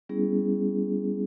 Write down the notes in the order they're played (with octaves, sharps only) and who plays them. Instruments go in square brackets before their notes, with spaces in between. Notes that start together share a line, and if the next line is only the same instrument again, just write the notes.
[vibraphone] G3 B3 C#4 E4 G#4